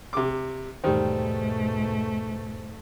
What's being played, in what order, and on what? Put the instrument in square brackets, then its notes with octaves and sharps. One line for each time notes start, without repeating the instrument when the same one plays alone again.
[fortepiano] C3 D6
[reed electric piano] E2 C5 [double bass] G#2 B2 [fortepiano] D#3 G3 [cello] A3